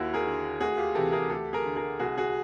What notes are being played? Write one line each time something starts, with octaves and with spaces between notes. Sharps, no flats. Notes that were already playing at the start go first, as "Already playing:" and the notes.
Already playing: D#2 E4 F#4
G#4 A#4
D3
D2 F#4 G#4
F4 G4
C3 E3 G4 A4
G#4 A#4
D2 G4 A4
G#4 A#4
D3
G#4 A#4
C2 F#4 G#4
F#4 G#4